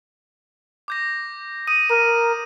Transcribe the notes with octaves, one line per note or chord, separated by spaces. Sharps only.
D6 G6 A#6
D#6 D#7
A#4 D#7